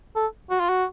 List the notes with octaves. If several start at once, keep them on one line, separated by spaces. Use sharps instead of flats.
A4
F#4
F4
F#4